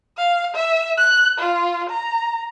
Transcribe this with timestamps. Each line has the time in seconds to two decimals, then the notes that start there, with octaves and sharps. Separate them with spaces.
0.17 F5
0.55 E5
0.97 F#6
1.39 F4
1.90 A#5